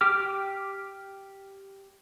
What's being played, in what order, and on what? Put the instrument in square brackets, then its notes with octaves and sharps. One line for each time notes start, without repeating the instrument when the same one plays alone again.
[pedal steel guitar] G4 G5 D6 F6